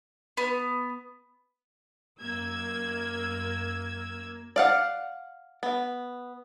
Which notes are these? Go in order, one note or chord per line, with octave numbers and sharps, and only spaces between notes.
B3
F#2 A#3 E6 G#6
D5 F5 F#5
B3